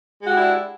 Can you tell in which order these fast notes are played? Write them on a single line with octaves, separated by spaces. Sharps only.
G#3 F#4 G4 E4 D4